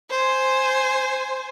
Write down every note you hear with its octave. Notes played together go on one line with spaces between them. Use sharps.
C5 G#5